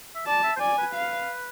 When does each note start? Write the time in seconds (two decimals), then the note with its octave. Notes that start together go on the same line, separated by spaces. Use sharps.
0.15 E5
0.27 D5 A5
0.43 E5
0.56 C5
0.60 D5 G#5
0.78 B4
0.94 F5